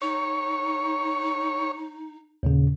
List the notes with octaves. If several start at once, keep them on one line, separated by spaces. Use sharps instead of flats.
D#4 C#5
D#2 A#2 C#3